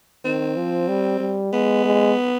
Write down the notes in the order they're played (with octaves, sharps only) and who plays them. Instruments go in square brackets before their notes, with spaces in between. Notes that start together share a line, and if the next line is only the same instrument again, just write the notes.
[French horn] D#3 [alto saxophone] C4
[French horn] F3
G3
G3
[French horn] G#3 [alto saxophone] B3
[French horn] G#3